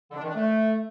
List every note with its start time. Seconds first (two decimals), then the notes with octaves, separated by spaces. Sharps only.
0.11 D3
0.17 D4
0.23 D#3
0.28 D4
0.34 A3